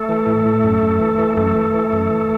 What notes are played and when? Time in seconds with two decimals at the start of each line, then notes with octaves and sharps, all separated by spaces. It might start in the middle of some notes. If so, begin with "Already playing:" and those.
Already playing: A3 A4
0.09 E3
0.27 A2
0.46 A2
0.63 F#2
0.83 F#2
1.01 E3
1.18 E3
1.37 F#2 A3 A4
1.55 E3
1.74 E3
1.92 F#2
2.10 E3